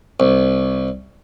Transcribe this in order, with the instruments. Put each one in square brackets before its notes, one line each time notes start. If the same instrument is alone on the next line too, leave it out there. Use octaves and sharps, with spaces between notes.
[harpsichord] C2